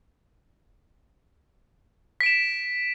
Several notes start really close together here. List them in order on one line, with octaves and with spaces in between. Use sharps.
B6 D7 E7